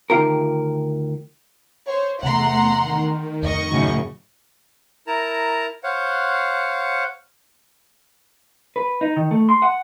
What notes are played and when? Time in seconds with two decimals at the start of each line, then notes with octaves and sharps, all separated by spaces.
0.10 D2 D#3 F4 G4 A#4
1.87 C5 C#5
2.23 E2 C3 A3 F#5 A#5 C6
2.79 D#3
3.42 D1 F2 D#5 C#6
3.70 F#2 A2 C#3
5.07 E4 A#4 A5 A#5
5.83 C5 C#5 F5 F#5
8.76 B4
9.01 D#4
9.16 D#3
9.31 A3
9.49 C6
9.62 F#5